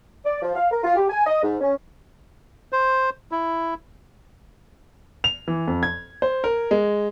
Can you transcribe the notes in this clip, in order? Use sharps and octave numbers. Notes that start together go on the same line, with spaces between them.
D5
F3
F5
A#4
F4
G4
G#5
D#5
G#2
C#4
C5
E4
F7
E3
F2
G#6
C5
A#4
G#3